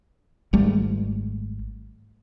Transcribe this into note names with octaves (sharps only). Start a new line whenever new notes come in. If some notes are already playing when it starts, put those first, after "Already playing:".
G#1 G3 A3